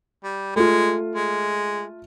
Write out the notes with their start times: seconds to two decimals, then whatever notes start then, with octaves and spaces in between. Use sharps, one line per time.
0.24 G3
0.56 G#3 A3 F4
1.15 G#3